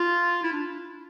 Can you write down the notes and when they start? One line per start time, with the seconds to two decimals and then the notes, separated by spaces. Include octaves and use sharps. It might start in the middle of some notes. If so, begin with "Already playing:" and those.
Already playing: F4
0.43 E4
0.53 D4